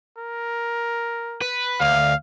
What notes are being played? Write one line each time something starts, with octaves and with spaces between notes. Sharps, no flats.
A#4
B4
D2 F5